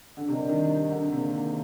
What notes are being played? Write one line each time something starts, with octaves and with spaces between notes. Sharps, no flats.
D3
C3 G3 D4 G4 A#4 D#5
D#3
D3
C3 D#3 A#3 D4 G#4